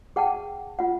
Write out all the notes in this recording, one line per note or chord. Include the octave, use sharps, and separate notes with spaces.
G#4 F#5 G5 A5
F4 F#5